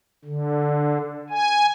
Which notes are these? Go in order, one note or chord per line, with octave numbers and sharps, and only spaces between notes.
D3
G#5